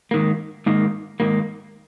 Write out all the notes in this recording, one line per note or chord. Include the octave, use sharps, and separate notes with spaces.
G#2 D#3 A#3
G#2 D#3 A#3
G#2 D#3 A#3